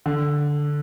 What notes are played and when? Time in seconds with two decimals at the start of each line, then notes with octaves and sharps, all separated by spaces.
0.06 D3